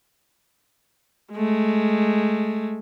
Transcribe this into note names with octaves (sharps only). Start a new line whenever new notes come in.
G#3 A3